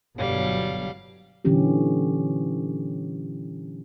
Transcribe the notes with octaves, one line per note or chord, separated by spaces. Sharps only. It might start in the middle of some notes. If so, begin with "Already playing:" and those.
G1 B2 F#3 G3 F5
A#2 D3 E3 F#3 C#4 G4